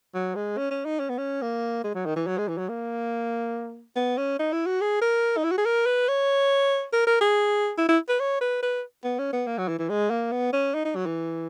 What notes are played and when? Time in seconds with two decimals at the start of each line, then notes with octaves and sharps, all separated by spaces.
0.14 F#3
0.35 G#3
0.57 C#4
0.71 C#4
0.85 D#4
1.00 C#4
1.09 B3
1.18 C#4
1.42 A#3
1.84 G#3
1.95 F#3
2.06 D#3
2.16 E3
2.27 F#3
2.38 G#3
2.48 E3
2.57 F#3
2.68 A#3
3.96 B3
4.17 C#4
4.39 D#4
4.52 E4
4.66 F#4
4.81 G#4
5.01 A#4
5.37 D#4
5.44 E4
5.51 F#4
5.58 G#4
5.65 A#4
5.86 B4
6.08 C#5
6.93 A#4
7.07 A#4
7.21 G#4
7.77 E4
7.88 E4
8.09 B4
8.20 C#5
8.41 B4
8.62 B4
9.04 B3
9.18 C#4
9.33 B3
9.47 A#3
9.58 F#3
9.68 E3
9.79 E3
9.89 G#3
10.10 A#3
10.32 B3
10.53 C#4
10.74 D#4
10.85 D#4
10.95 F#3
11.06 E3